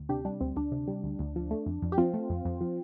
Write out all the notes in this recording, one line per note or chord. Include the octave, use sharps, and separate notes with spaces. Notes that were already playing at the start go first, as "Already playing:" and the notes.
Already playing: D2
C3 D4 G4
G3 D4
D2 C4
D2 D4
C3
G3
D2
D2
F3
A3
F2
F2
G4
F3 C4 F4
A3
F2
F2
F3